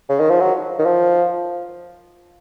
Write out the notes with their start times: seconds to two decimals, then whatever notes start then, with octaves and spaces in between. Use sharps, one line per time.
0.09 C#3
0.20 D#3
0.30 F3
0.40 F#3
0.79 D#3
0.85 F3